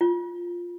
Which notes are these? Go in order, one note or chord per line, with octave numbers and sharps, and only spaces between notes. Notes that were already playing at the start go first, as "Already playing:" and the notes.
F4